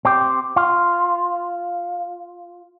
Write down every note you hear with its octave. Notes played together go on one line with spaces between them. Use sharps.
C4 G4
F4